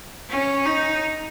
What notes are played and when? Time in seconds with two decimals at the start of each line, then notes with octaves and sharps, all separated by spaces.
0.30 C#4
0.66 D#4